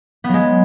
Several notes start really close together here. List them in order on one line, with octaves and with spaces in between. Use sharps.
B3 F#3 G#3